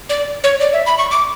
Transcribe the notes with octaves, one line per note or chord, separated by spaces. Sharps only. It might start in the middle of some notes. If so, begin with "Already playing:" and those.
D5
C#5
D5
E5
B5
C#6
D6